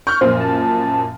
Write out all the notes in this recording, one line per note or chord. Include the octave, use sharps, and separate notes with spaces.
C#6 F6 G6
F#2 A#2 F3 C5
A5